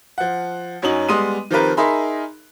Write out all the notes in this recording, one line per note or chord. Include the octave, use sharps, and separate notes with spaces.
F3 F#5
F#2 F#3 C#4 D#4 F#7
G3 G#3 B3 C6 D#6 D#7
D#3 F3 C4 G4 A#4 B4
D#4 G#4 A#4 E5 B5 C6